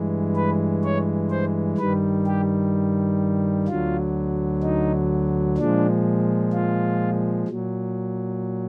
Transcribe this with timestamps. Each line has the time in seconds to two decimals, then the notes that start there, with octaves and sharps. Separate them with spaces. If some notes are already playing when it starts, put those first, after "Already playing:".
Already playing: G2 E3 G#3
0.36 B4
0.83 C#5
1.31 C5
1.78 G2 D#3 G3 B4
2.27 G4
3.68 D2 D3 F#3 F4
4.63 D#4
5.58 A#2 F3 G#3 D4
6.53 F4
7.48 A#2 F#3